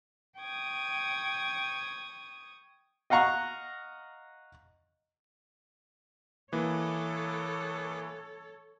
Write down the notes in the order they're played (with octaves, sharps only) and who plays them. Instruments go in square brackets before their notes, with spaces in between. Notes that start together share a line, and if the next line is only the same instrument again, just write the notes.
[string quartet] G5 C#6 D#6 G#6
[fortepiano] D#5 F5 F#5 A#5 C#6
[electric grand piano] E3 A#3 [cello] A4 C#5 [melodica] B4 D6 D#6